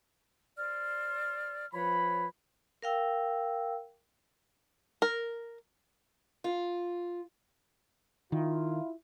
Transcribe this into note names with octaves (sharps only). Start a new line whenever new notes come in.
C5 D5 F6
F3 B4 C#5 B5
A#4 F5 G5 E6
A#4
F4
D#3 E4 F4